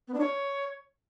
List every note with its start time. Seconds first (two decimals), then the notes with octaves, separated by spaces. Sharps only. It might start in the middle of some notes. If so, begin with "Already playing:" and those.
0.08 B3
0.14 D4
0.20 C#5